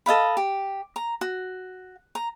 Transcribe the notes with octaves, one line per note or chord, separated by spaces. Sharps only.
A4 D#5 F5 B5
G4
A#5
F#4
A#5